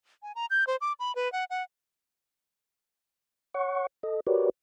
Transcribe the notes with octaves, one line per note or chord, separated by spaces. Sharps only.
G#5
A#5
G6
C5
D6
B5
B4
F#5
F#5
C#5 F#5 C#6
A4 D#5
F#4 G4 A#4 B4 C#5 D5